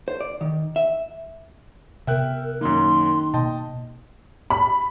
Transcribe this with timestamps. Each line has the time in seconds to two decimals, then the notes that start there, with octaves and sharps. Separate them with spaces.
0.08 C5
0.21 D5
0.41 D#3
0.76 E5
2.07 C3 B3 A#4 E5 G5 F#6
2.61 F#2 D#3 A#3 C6
3.34 B2 A#3 D#5 G5 A5
4.50 B5